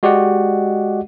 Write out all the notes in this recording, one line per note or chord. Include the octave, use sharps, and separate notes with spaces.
G#3 F#4 G4 D5 D#5 F#5